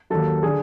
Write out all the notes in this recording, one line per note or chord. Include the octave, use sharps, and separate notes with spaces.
D#2 D#3 F#3 A4
D3 G#4